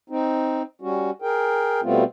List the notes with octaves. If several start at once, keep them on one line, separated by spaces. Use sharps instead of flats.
C4 D#4
G3 C#4 F#4
G#4 A#4 G5
B2 G3 A3 B3 C4 F4